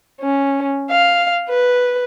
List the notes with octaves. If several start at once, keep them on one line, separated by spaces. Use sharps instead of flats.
C#4
F5
B4